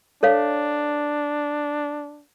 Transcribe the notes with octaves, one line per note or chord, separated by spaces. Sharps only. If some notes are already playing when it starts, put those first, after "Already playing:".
D4 A4 C#5 F5